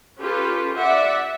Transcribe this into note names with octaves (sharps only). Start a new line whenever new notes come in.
C#4 F4 G4 A4 B4
D5 E5 F#5